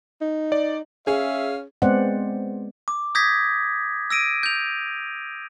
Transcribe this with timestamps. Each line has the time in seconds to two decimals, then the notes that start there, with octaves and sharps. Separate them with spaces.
0.21 D#4
0.52 D5
1.07 C#4 G#4 E5 F5
1.82 G#3 B3 C4 C5 D5 F#5
2.88 D6
3.15 D#6 G6 G#6 A#6 B6
4.10 E6 A#6 D7 D#7
4.43 G6 F7